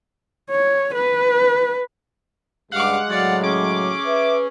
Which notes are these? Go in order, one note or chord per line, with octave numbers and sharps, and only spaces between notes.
C#5
B4
C#2 G2 G3 G#3 F5 F#5 D6
A2 C#3 F#3 D5 F5
C#4 G#4 D6
B4 E5